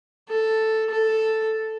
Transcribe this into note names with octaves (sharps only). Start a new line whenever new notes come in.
A4
A4